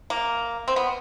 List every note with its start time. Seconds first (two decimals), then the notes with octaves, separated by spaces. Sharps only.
0.10 A#3
0.68 C4
0.76 B3